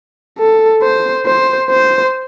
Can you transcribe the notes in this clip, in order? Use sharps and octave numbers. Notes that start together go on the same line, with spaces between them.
A4
C5
C5
C5